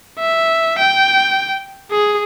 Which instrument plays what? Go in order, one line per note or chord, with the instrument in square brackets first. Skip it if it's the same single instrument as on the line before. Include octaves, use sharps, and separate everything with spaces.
[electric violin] E5
G5
G#4